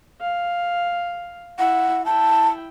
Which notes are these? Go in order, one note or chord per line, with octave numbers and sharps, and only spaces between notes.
F5
E4 F#5
E4 G5 A5